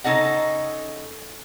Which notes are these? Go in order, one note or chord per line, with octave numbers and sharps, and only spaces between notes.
C#3 D#4 A4 D#5 F#5